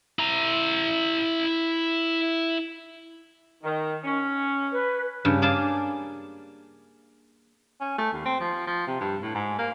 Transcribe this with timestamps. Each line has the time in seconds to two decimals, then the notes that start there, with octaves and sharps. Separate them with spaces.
0.19 E4 A#5
3.64 D#3
4.04 C#4
4.72 B4
5.25 G2 C#3
5.42 A#3 G#4 D5 A5
7.81 C#4
7.98 A3
8.12 D#2
8.25 C4
8.40 F3
8.67 F3
8.87 C3
9.00 G2
9.22 A2
9.35 G#2
9.58 A#3